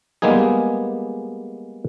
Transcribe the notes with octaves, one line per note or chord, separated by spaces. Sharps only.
G3 G#3 A#3 B3 D#4 G#4